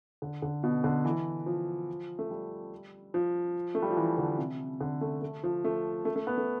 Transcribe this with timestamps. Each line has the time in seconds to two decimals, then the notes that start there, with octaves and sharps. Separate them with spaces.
0.22 D3
0.42 D3
0.64 B2
0.84 D3
1.05 E3
1.46 F3
2.19 A3
2.31 G3
3.14 F3
3.75 A3
3.82 G3
3.90 F3
3.97 E3
4.18 D3
4.38 C3
4.81 D3
5.01 A3
5.22 A3
5.43 F3
5.64 A3
6.05 A3
6.16 A3
6.27 B3
6.37 A3